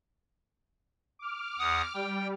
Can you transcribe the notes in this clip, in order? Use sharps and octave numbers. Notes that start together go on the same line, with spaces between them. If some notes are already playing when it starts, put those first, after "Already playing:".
D6 F6
E2 F#5 D#6
G3 G5